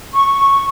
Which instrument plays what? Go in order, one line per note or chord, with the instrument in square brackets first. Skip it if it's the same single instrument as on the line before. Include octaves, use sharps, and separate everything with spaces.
[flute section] C#6